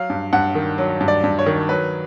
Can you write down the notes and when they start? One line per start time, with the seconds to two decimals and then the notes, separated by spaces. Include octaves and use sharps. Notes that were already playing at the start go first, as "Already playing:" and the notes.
Already playing: F#3 F5
0.10 G2
0.33 G2 F#5
0.55 D#3
0.78 F#3
1.01 G2
1.08 D5
1.24 G2
1.39 C#5
1.46 D#3
1.69 F#3 B4